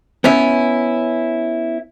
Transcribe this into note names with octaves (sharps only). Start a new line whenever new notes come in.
B3 C#4 E4